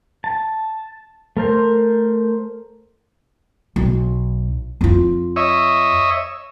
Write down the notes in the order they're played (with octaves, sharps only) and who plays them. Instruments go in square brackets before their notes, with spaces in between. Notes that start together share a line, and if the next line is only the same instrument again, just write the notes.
[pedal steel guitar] A5
A3 A#4 C5
[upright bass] B1
F2 F4
[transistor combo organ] C#5 D#5 E5